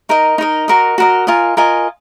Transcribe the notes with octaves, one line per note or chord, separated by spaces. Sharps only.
D#4 A#4 D#5
D#4 A#4 D#5
F#4 A#4 D#5
F#4 A#4 D#5
F4 A#4 D#5 G#5
F4 A#4 D#5 G#5